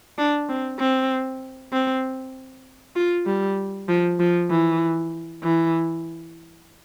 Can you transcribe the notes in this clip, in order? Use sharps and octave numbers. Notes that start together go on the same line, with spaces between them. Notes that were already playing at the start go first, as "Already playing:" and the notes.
D4
C4
C4
C4
F4
G3
F3
F3
E3
E3